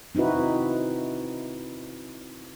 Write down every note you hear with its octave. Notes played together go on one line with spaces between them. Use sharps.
C4 D#4 E4 F#4 B4